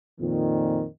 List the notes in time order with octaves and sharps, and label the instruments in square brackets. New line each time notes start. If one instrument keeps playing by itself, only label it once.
[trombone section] F2 A#2 D#3